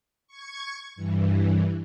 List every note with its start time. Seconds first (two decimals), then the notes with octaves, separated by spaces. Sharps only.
0.27 C#6 G#6
0.95 G2 E3